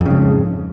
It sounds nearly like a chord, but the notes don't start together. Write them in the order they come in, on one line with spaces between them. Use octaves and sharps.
F2 C#3 G#2